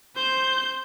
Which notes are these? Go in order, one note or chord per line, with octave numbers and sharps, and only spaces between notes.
C5 G6